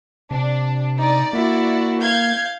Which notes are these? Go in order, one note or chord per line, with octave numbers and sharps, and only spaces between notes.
C3 D4
D#4 D5
A#3 E4 F#4
F5 G6 G#6